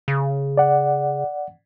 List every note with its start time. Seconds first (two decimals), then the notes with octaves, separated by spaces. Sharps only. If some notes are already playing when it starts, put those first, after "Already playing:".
0.08 C#3
0.57 D5 F#5